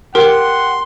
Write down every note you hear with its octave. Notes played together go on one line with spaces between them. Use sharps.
G4 A#4 F#5 C6